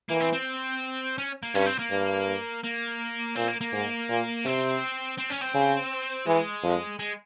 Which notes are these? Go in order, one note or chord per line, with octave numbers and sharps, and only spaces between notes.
E3 A#3
C4
C4
C#4
A#3
G2 C#4
C4
A#3
G2
A#3
A#2 C4
A#3
A#3
G#2
A#2
C3 C4
C4
C#4
C4
C#3
E3 G#3
F2
G#3